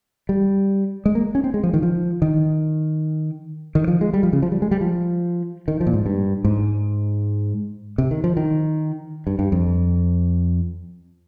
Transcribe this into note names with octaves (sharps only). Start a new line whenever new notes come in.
G3
G#3
A#3
C#4
C4
G#3
F3
D#3
F3
D#3
D#3
F3
G#3
G3
F3
C#3
F3
G3
G#3
G3
F3
D#3
F3
A#2
G#2
G2
G#2
C3
D#3
F3
D#3
G2
G2
F2